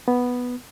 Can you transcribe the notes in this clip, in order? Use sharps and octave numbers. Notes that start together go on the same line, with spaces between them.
B3